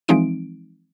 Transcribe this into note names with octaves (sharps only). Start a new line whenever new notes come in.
E3 F3 G#3 C4 D#4 D7